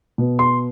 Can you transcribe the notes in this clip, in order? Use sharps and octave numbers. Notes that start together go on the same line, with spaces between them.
B2
C6